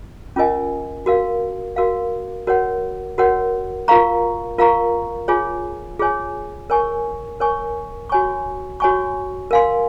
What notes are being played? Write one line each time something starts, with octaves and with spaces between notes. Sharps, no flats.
C#4 F4 A#4 D#5 G#5
F#4 A#4 F5
F#4 A#4 F5
F#4 A#4 C#5 F#5
F#4 A#4 C#5 F#5
F4 A#4 F5 A#5 C#6
F4 A#4 F5 A#5 C#6
F4 G#4 C#5 G#5
F4 G#4 C#5 G#5
A#4 C#5 G#5 C#6
A#4 C#5 G#5 C#6
F#4 C#5 G#5 C#6
F#4 C#5 G#5 C#6
A#4 F5 G#5 C6